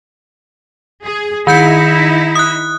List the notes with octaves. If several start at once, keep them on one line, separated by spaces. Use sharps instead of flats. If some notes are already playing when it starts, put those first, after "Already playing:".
G#4
D#3 D#4 E4 G6 C#7
D#6 F#6